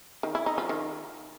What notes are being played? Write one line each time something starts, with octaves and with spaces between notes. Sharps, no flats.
D#3
E4
D#4
F3
D#3